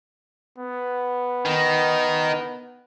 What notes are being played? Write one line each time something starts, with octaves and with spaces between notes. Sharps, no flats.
B3
D#3